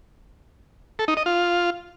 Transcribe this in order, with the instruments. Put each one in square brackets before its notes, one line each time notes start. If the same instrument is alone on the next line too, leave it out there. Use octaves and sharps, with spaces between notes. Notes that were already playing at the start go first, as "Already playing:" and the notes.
[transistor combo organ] A4
D#4
D#5
F4